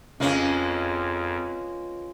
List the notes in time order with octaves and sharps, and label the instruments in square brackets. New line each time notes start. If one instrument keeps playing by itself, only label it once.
[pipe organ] F2 [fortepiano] C#3 [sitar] G#3 A#3 C#4 [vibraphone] F4 B4